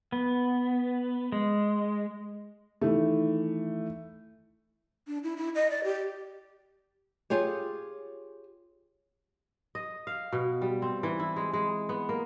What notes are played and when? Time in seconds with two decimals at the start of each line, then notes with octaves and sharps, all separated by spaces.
0.12 B3
1.32 G#3
2.81 D#3 E3 A3
5.07 D4
5.24 E4
5.37 E4
5.55 D#5
5.70 D5
5.84 G4
7.30 F4 G4 G#4 C#5
9.75 D#5
10.07 F5
10.33 B2
10.62 G3
10.82 C4
11.03 E3
11.20 E4
11.36 G#3
11.53 G#3
11.89 B3
12.09 A#3